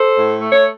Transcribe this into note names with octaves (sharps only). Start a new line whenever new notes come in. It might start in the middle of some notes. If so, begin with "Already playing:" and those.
Already playing: A4 C5
A2
A3
C#5